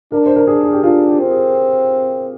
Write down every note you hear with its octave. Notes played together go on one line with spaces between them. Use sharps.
D4 A#4
C5
A#4
D4 G#4
G#4
G4
D4 F4
G4
C4
G#4